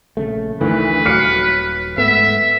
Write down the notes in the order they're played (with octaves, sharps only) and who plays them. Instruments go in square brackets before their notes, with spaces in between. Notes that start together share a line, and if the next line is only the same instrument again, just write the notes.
[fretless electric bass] A#1 C#3 A3
[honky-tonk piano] D2 [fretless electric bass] D#3 E3 [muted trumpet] B4
[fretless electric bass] D#1 F#3 [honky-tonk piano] F6 C7 C#7
[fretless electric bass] G#2 A3 B3 [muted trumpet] E5